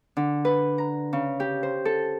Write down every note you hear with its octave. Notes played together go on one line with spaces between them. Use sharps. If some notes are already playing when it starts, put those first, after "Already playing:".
D3
B4
A#5
C#3
G4
C5
A4